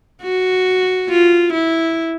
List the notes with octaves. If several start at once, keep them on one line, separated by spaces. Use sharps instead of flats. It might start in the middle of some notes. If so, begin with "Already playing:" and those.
F#4
F4
E4